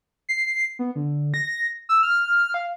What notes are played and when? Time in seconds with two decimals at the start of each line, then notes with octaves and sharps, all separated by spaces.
0.29 C7
0.79 B3
0.95 D3
1.34 A#6
1.89 E6
2.03 F6
2.54 F5